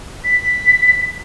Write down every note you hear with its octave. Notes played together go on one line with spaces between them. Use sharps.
B6